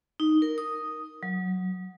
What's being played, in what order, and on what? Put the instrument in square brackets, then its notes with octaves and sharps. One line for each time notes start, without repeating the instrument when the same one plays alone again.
[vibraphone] D#4
A#4
D#6
F#3